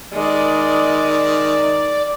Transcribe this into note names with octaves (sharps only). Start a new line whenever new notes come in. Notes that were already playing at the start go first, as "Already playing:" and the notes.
D#3 G#3 D5